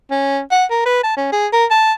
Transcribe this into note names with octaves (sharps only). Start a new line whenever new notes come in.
C#4
F#5
A#4
B4
A5
C#4
G#4
A#4
A5